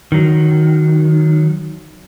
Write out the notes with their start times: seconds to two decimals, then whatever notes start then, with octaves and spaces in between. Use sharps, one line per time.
0.12 D#3 F#3